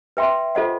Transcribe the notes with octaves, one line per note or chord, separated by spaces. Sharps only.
B4 E5 G5 C6
F4 A4 C5 D#5 F#5